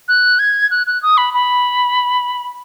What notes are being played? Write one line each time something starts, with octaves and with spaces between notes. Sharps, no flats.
F#6
G#6
F#6
F#6
D#6
B5
B5